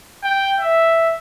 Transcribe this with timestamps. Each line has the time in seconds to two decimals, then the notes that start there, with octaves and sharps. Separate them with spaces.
0.23 G5
0.60 E5